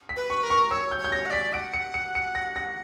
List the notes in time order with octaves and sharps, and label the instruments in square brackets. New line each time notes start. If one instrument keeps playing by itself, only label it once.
[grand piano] B6
[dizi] B4
[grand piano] C#6
[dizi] A#4
[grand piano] C#6
[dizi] C#5 [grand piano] E6
[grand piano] G6
[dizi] C#5
[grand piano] G6
A#6
[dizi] F#5
[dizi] D5 [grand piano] B6
[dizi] F#5 [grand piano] D7
[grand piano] C#7
C#7
C#7
A#6
A#6